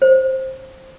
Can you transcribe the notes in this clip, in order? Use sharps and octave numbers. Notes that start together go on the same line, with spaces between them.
C5